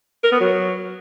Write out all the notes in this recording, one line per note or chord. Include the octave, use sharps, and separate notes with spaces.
A#4
B3
F#3